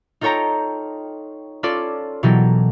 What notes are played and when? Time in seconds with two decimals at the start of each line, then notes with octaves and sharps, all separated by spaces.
0.21 D#4 F4 A4 C#5 G5 A#5
1.63 C#4 F4 A4 D5
2.23 B2 E3 F#3 G4 A4 A#4